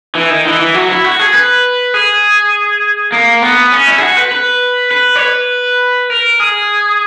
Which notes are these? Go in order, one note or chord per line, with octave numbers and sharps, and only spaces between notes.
E3
D#3
E3
E3
F#3
E4
F#4
G#4
B4
G#4
A#3
B3
C#4
E4
G#4
F#4
B4
B4
B4
C#5
B4
A#4
G#4